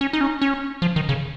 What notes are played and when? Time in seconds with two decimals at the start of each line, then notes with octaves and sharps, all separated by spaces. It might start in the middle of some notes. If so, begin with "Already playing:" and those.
0.01 C#4
0.13 D#4
0.21 C#4
0.41 C#4
0.82 F3
0.96 D#3
1.09 C#3